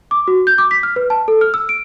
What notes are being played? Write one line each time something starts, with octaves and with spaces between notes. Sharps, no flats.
D6
F#4
G6
D6
B6
F6
B4
A5
A4
F6
E6
D7